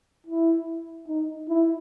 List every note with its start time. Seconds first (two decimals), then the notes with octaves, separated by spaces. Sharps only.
0.27 E4
1.08 D#4
1.49 E4